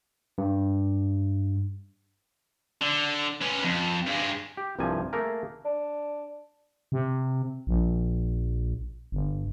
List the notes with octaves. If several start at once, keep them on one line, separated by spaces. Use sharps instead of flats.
G2
D3
C#4 B4
F2
G2 G#3
G4
C2 G2 C3 F3 G#5
A3 A#3 G#4 A#4
D4
C3
A#1
G1